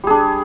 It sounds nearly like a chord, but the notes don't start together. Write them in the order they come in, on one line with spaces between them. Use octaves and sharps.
G3 G#4 D4